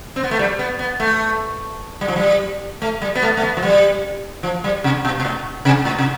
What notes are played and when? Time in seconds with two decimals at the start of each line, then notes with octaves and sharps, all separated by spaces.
0.16 C4
0.23 B3
0.31 A3
0.39 G3
0.59 B3
0.79 B3
1.00 A3
2.01 G3
2.08 F3
2.16 G3
2.82 A3
3.02 G3
3.15 B3
3.22 A3
3.37 A3
3.42 B3
3.57 F3
3.63 G3
4.43 F3
4.64 G3
4.84 C3
5.05 B2
5.20 B2
5.25 A2
5.65 C3
5.85 A2
5.98 C3